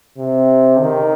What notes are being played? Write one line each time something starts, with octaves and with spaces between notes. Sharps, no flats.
C3
D#3